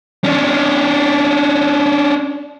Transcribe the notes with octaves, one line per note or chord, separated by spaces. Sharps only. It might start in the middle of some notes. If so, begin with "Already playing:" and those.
C#4 D4